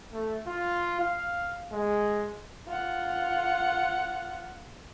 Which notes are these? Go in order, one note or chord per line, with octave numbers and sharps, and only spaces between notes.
A3
F4
F5
G#3
F4 F#5